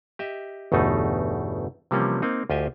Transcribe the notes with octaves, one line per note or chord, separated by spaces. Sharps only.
G4 D#5 E5
G1 E2 B2 A3 D#4
C3 E3 F3 G3 A#3 C#4
A#3 C4 D#4
D2 F4 G4 D#5 E5 G#5